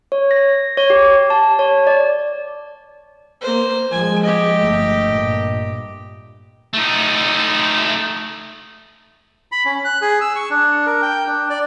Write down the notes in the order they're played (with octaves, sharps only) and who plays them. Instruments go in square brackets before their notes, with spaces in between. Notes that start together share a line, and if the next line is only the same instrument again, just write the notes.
[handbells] C#5
A#6
C#5
G4
A5
C#5
D5
[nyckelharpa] A#3 C5
[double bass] F3 G#3 [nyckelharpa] G#5
[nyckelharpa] G4 D#5
[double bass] G1 A3
G2 A#2
[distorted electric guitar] A3 D#4
[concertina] B5
C#4
F#6
G#4
E6
C#6
D4
A#4
G5
D4
D5